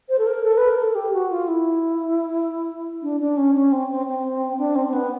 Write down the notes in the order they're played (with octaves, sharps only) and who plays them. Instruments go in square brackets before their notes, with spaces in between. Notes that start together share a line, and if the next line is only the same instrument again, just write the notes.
[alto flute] C5
A4
A#4
A4
B4
A#4
A4
G4
F#4
F4
E4
D4
D4
C#4
C#4
C4
C4
C4
D4
C4
C4
B3